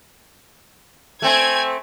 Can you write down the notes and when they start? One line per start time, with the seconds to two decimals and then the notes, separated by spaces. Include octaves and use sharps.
1.22 A3 C4 G#5 G#6